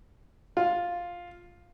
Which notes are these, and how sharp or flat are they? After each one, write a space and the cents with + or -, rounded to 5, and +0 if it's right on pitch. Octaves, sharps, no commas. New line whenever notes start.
F4 +5